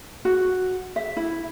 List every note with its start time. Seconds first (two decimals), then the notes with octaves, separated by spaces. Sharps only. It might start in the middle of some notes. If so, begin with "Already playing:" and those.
0.25 F#4
0.96 E5
1.17 E4